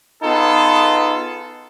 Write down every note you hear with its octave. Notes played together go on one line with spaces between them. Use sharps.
B3 D#4 F4 G#4 A4